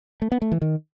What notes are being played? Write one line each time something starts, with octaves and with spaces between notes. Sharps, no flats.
A3
B3
A3
E3
D#3